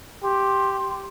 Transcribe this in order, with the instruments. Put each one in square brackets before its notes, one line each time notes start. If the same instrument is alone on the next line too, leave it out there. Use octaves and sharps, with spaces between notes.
[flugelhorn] G4 [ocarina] C6